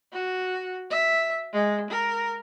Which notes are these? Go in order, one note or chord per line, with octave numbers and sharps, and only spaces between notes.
F#4
E5
G#3
A#4